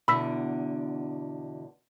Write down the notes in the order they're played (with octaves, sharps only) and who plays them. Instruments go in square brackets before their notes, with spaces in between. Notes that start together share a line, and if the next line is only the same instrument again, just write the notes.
[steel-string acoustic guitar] E2 B2 D3 [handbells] B5 E6 B6